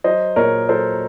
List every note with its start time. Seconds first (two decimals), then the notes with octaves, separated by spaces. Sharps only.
0.04 F#3 C5 D#5
0.36 A#2 A#4 C#5
0.69 F#3 A4 C5